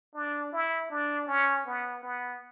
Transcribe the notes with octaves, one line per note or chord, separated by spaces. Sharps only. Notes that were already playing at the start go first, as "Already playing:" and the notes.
D4
E4
D4
C#4
B3
B3